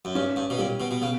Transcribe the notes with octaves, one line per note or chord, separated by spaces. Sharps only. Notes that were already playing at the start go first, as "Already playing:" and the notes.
F#2
G2 C#4
G2
B2
A#2 G3
B2
B2
C#3 B3